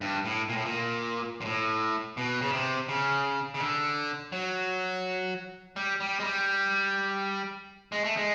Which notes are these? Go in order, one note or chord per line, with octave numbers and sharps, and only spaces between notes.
G2
A2
A#2
A2
A#2
A#2
A2
B2
C#3
C3
C#3
C#3
D3
F#3
G3
G3
G#3
G3
G#3
A3
G#3